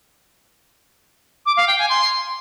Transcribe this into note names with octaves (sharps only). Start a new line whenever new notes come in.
D6
F5
G5
G#5
C6